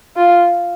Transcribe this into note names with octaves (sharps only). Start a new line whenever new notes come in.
F4